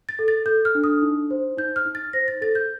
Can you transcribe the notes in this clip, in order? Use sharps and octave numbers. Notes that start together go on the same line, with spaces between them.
A6
A4
A6
A4 G6
F6
D4
D#6
D#4
C5
D#4 G6
F6
D#4
A6
C5 A#6
A6
A4 A6
G6